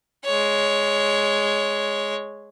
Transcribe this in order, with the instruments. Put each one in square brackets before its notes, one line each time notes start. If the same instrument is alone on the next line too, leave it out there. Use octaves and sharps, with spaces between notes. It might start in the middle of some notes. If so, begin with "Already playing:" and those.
[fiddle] G#3 C#5